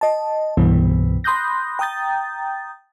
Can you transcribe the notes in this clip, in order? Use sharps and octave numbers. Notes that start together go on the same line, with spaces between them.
D#5 A5
C2 G2 B2 E3 B3
B5 C6 D#6 F#6 G6 A#6
G5 A#5 D#6 G6 A6